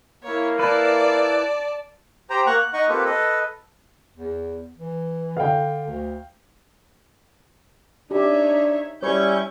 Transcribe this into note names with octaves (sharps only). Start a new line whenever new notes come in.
A#3 E4 C#5
E4 B4 D5 A5
G4 C5 G5 A#5
A#3 F#5 A#5 C#6 F#6
F#6
D#4 D#5 F#5 C#6
A#3 C4 F4 G4 A4 B4
A4 B4 D#5
E2
E3
D3 F5 G5
D2
D4 D#4 G4 C#5 E5
G3 C#4 E4 C#5 C#6 G6